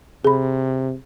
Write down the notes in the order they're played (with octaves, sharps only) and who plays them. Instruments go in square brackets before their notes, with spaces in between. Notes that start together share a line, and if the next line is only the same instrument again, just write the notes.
[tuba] C3 [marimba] G#4 B5